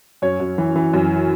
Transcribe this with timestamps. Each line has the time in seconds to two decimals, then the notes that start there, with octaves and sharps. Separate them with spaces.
0.22 F#2 C#5
0.40 F#2
0.58 E3
0.76 E3
0.94 F#2